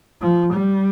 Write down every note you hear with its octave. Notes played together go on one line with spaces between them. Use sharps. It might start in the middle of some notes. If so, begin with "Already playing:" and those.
F3
G3